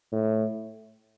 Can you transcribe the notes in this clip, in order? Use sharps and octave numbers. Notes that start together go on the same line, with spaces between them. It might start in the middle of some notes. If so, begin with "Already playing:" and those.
A2